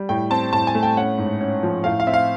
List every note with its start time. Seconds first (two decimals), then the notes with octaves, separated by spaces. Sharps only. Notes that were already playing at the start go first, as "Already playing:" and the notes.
Already playing: G3
0.09 A2 G5
0.31 C4 A5
0.53 A2 A5
0.67 G#5
0.75 A3
0.83 G5
0.97 C#4 F#5
1.18 G#2
1.41 C#4
1.63 F3
1.84 A2 F5
2.00 F5
2.07 C4 E5
2.14 F5